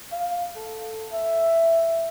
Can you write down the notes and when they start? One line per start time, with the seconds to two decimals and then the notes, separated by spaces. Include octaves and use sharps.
0.12 F5
0.56 A4
1.12 E5